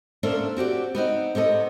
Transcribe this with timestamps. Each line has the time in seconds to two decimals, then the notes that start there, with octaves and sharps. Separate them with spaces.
0.23 A#3 C#4 D4 A4 C5 E5
0.57 C4 F#4 G4 D5
0.95 B3 C4 D#4
1.35 C3 B3 A4 D#5